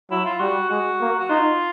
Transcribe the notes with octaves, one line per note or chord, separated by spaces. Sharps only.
F#3 E4
F4
G3 F#4
G#3 F#4
A#3
F#4
D#4 F4